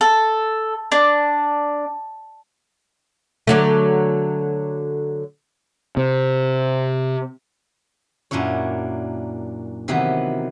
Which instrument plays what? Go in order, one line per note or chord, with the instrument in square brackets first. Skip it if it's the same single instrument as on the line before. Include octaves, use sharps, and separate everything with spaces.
[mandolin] A4
D4
[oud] D3 F#3 A3
[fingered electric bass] C3
[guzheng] F#2 A#2 D4 E4 C#5
C3 D#3 E3 F#3 B3